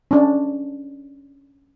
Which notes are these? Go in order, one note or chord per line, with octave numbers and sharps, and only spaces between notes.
C#4 D4